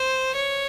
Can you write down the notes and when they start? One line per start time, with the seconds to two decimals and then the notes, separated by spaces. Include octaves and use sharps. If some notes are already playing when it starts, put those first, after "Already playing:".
Already playing: C5
0.36 C#5